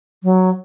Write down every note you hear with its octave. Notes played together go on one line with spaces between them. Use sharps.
F#3